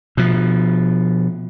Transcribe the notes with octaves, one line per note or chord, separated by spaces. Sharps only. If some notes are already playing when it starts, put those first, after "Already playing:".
B2 F3